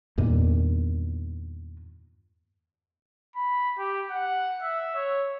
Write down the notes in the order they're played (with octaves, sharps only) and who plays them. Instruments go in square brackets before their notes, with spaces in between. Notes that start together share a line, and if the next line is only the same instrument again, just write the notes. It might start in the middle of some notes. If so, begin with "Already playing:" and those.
[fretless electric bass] E2 G2 A#2 D#3
[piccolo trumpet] B5
G4
F#5
E5
C#5